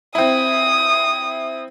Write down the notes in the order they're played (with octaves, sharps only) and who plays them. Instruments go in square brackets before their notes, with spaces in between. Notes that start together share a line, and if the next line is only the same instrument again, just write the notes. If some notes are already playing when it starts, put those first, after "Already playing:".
[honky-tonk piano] C4 E4 [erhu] D#6